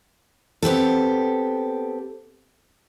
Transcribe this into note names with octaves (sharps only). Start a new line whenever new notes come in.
B3 C4 G4 A4